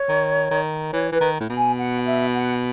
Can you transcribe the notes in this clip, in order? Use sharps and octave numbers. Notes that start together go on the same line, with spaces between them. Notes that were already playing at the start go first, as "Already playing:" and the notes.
Already playing: C#5
D#3
D#3
E3 C#5
E3 B4
D#3
A2
B2
G#5
F#5
E5
F#5